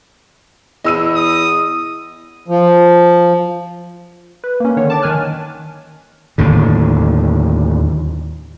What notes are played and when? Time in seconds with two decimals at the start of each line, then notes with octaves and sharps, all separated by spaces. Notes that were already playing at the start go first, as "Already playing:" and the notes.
0.84 E2 D#5 E6 D#7
1.16 D#6
2.48 F3
4.44 B4
4.60 A#3 C#4
4.77 D3 D#3 C#5
4.90 A5 D6 A6
5.02 D#3 C#5 G#5 F6 F#6
6.38 D#2 A2 D3